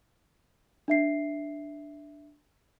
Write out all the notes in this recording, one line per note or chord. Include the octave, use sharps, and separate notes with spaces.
D4 E5 C7